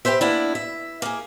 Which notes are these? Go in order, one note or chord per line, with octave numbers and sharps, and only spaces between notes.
G4 A4 B4 C5 E5
A#3 B3 D4 E4
E5
A#3 G#4